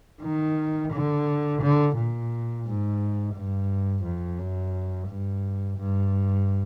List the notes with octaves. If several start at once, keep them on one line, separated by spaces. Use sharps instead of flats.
D#3
D3
D3
A#2
G#2
G2
F2
F#2
G2
G2